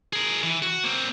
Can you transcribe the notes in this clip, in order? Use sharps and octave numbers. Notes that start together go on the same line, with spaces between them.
G#4 A#4
E3
F#4
A#3 C4